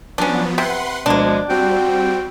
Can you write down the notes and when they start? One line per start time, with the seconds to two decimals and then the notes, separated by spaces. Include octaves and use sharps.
0.18 F3 F#3 B3 C#4 D4
0.58 C3 B4 F#5 C6
1.06 D2 B2 F3 G#3 A#3 D4
1.50 G3 C4 F#4 G5